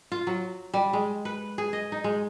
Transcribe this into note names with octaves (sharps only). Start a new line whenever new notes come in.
F4
F#3
G3
G#3
B4
G#4
D#5
D#4
G#3